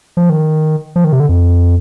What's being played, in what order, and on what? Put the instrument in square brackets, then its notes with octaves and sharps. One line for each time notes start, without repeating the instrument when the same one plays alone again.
[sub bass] F3
D#3
F3
D#3
C3
D3
F2